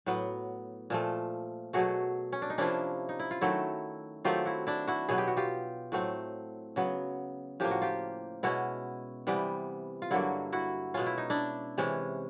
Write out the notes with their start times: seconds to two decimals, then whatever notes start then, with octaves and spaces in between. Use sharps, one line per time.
0.06 A2 F#3 B3
0.90 A#2 F3 A3
1.73 B2 F#3 A3 F#4 G#4
2.32 C#4
2.42 D4
2.50 D#4
2.58 C3 F3 A#3 C#4 D4 E4
3.09 D#4
3.19 E4
3.31 F4
3.41 D#3 F#3 A3 E4 F#4
4.24 D#3 F#3 A3 C4 F4 G4
4.45 E4 F#4
4.67 D4 E4
4.87 E4 F#4
5.09 B2 F#3 B3 G#4
5.18 G4
5.28 F#4
5.37 F4 G4
5.92 A2 F#3 A3 C4
6.76 C#3 F#3 B3
7.60 A2 F3 A#3 G4
7.71 F#4
7.82 F4 G4
8.43 B2 G#3 C#4 E4 F#4
9.27 C3 E3 G3 B3
10.02 F4
10.11 G2 D3 F#3 A#3 E4 F#4
10.52 E4 F#4
10.94 B2 G#3 C#4 F4
11.06 E4
11.18 D#4
11.30 D4 E4
11.78 C3 E3 G#3 C#4